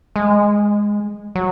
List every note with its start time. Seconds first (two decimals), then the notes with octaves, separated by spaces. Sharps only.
0.16 G#3
1.35 F#3